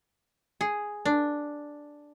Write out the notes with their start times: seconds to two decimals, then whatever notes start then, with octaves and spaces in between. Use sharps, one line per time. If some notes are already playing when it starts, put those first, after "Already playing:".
0.61 G#4
1.05 D4